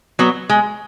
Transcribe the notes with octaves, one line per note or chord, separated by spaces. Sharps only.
F#3 B3
G#3